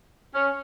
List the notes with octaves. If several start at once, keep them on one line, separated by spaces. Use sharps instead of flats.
C#4